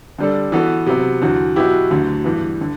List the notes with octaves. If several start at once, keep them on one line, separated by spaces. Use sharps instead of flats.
D3 G3 D4 A4
E3 B3 F#4 A4
C3 F#3 B3
E2 D3 F#3
B2 F#3 B3 E4 G4
D2 D3 F#3
G2 E3 B3
D3